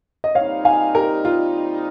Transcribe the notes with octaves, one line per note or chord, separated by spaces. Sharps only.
D#5
A#2 G3 C4 D#4 C#5 F5
F5 G#5
G4 A#4
F4